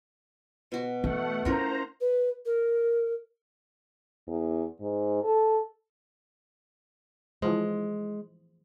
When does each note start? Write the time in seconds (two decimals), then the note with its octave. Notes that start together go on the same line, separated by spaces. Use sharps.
0.72 B2 F#4
1.04 E3 A3 F#5
1.45 C#4 E4 F4 A#4 C5 A#5
2.00 B4
2.45 A#4
4.27 E2
4.81 G#2
5.23 A4
7.42 E3 F3 G#3 C5